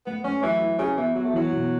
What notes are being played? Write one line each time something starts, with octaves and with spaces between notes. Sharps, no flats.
A3 B3
A3 C#4
E3 F#3
E4
C#3 F#4
E3 B3
F#3 B3
A3
E3 F#3
B2